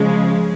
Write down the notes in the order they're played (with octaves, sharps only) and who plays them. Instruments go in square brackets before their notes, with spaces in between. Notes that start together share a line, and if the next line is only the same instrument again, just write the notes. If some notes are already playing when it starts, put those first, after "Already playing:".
Already playing: [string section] C#3 F3 G#3